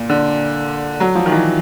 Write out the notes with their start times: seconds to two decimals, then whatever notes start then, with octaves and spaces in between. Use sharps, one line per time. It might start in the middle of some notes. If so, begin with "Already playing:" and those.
Already playing: A#2
0.10 D3
1.00 F#3
1.15 F3
1.26 D#3
1.31 E3